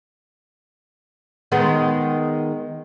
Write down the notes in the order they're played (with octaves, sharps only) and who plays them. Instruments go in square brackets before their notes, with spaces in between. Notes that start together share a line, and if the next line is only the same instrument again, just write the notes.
[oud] D#3 G#3 B3